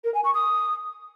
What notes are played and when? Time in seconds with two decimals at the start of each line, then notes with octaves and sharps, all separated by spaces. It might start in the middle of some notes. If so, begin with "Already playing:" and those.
0.04 A#4
0.14 G#5
0.24 C#6
0.34 D#6